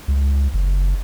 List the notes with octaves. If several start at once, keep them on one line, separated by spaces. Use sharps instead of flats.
C#2
F#1